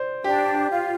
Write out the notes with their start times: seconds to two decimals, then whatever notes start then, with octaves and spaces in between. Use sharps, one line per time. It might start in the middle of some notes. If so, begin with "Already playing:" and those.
Already playing: C5 D5
0.24 D4 G4
0.55 G4
0.70 F4